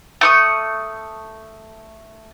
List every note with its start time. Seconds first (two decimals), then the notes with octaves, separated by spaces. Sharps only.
0.21 A3 C#6 D#6